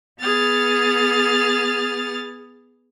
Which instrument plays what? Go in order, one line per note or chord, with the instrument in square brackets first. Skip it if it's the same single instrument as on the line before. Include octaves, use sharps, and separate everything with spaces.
[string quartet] B3 G#4 F6 A6